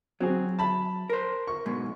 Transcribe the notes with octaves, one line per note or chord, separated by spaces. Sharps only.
F#3 C4 F#4 G#4
A5 B5
A#4 C5
C#6
G#2 B2 G#3